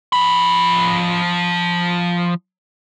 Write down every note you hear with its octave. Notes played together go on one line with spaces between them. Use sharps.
F3 B5